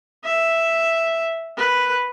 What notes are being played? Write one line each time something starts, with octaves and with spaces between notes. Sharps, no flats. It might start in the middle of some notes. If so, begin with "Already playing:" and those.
E5
B4